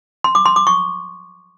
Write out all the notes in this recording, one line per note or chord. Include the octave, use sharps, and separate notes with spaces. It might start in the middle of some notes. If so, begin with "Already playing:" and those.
C6
D6
C6
D6
C#6